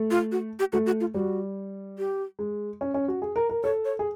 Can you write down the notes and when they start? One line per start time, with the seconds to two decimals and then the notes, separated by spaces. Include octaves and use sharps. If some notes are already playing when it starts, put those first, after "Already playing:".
Already playing: A3
0.11 F4
0.32 F#4
0.59 G4
0.73 A3 F#4
0.86 F#4
1.01 F4
1.14 G3 F#4
1.98 G4
2.39 G#3
2.81 C#4
2.94 C#4
3.08 F#4
3.22 G#4
3.36 A#4
3.50 A#4
3.63 A4 C#5
3.85 C#5
3.99 G#4